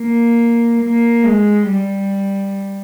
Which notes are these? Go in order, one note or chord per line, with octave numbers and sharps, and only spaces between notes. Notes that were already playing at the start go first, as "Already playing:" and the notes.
Already playing: A#3
A#3
G#3
G3